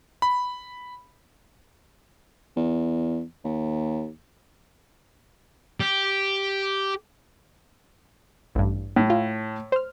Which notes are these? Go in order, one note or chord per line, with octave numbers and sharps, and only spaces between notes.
B5
E2
D#2
G4
A1 G2
A2
F4
C5 F6